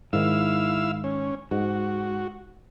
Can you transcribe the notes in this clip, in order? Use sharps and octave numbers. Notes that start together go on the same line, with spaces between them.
G#2 D#3 E4 F5 E6
C#4
G#2 F#4